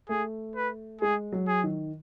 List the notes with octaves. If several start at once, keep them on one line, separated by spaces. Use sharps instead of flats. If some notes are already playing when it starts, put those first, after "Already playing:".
A3 G#4
B4
G#3 G#4
F#3
G#4
D#3